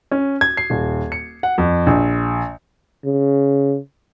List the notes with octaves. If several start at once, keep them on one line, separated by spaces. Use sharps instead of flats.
C#4
G#6
C7
D#1
C#7
F#5
F2
A#1
C#3